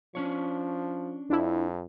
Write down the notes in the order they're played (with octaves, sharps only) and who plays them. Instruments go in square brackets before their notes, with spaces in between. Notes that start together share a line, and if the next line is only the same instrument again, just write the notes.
[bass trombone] F3 [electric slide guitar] C#4 D4 C#5
[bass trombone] F2 [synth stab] D4 E4